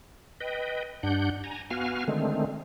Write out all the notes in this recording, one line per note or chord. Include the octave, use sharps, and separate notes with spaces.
B4 D#5 G5
G2 D4 F#5 G6
G#5 A#5
B3 F#4 F5 G#5 F6
D3 D#3 G#3 A3 C4